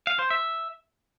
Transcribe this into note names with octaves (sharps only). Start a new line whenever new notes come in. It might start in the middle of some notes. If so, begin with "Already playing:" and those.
F5
C5
E5